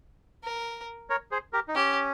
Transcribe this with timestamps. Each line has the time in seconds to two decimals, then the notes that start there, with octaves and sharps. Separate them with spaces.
0.44 A#4
1.10 A#4 C#5
1.31 G#4 C5
1.53 G4 A#4
1.68 D#4
1.75 C#4 G4